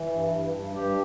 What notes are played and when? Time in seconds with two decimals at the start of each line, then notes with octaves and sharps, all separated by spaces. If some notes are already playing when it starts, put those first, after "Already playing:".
Already playing: E3
0.13 G2
0.34 G2
0.55 G2
0.75 G2 G4